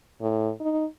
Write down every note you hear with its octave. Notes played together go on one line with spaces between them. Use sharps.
A2
D#4